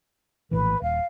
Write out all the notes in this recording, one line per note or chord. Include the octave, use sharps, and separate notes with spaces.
A#1 A2 E3 B4
D#1 F5